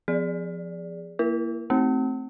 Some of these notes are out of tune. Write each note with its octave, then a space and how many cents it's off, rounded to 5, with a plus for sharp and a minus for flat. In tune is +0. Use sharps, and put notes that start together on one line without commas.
F3 +0 G#4 -10 D5 -10
A#3 +0 E4 +25 A#4 +0
A3 +0 C4 +0 F#4 +25